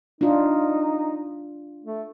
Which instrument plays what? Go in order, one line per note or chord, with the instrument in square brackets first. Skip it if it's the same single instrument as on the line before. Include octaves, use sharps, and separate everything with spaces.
[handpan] D4 F4 [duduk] D#4
[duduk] A3